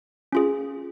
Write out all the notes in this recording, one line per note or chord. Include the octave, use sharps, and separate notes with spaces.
C#4 F4 G#4